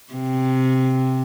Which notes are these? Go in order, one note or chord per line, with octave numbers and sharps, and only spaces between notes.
C3